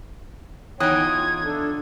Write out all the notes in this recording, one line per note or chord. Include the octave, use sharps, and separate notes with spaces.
E2 D#4 C#5 G5 D#6 F#6 G#6
F4
D4 A4